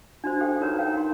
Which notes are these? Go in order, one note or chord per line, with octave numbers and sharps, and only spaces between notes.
D4 F#4 C5
G4 A4 F5 G5
D#4 F#4 A#4 B4 C#5 A#5
A#4 C#5 F5 G5 A#5
D#4 C6